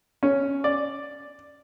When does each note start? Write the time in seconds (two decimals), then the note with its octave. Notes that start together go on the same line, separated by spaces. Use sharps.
0.23 C#4
0.64 D5